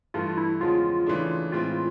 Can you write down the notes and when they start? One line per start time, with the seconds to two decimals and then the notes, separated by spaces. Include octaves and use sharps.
0.14 G2 E3 A3 F4
0.38 E4
0.61 E2 C#3 F3 G#3 F4
1.06 C#3 E3 A3 D4
1.52 A2 E3 G#3 C4 F4